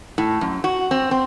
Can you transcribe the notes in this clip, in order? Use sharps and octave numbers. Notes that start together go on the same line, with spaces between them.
A2
F#2
F#4
C4
C4